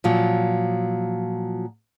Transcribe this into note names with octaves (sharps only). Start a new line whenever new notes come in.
A#2 F3 F#3